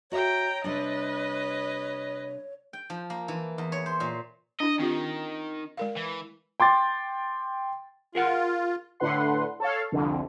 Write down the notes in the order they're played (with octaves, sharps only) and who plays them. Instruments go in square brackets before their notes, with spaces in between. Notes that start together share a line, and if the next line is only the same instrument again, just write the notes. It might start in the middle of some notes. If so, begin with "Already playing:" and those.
[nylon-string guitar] F#4 D#5 E5 [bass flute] C#5 [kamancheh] G5 A#5
[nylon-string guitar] C3 G3 D4 [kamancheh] B4 D#5
[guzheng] G5
F3
A#3
E3
E2
C#5
C5
A#2
[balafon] D4 E4 [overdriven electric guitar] D#5
[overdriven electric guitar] D#3 [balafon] C4 F4 G4
[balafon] G#3 A#4 F5
[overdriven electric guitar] E3
[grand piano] G5 C6 D6 A6
[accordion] F4 [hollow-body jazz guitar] G#4 A#4 F#5
[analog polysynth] A2 D3 B4 F#5 C6
A4 C#5 F5
C2 F2 D3